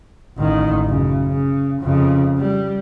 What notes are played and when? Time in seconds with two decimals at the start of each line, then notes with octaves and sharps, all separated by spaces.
0.38 A1 D#3
0.85 F#2 C#3
1.26 C#3
1.82 F2 C#3
2.38 G3